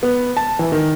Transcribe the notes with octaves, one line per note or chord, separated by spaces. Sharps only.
B3
A5
E3
D#3